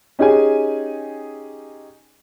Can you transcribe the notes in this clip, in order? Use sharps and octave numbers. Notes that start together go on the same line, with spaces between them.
C#4 D#4 G4 G#4 G#5